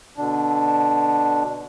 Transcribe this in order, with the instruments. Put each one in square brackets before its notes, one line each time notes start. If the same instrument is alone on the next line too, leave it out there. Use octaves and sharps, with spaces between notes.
[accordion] B2 D3 D4